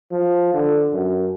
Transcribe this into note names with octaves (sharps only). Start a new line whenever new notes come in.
F3
D3
F#2